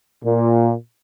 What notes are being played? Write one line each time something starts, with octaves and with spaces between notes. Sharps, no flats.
A#2